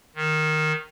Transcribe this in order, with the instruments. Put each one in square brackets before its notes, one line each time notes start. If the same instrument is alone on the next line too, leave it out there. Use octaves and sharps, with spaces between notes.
[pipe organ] D#3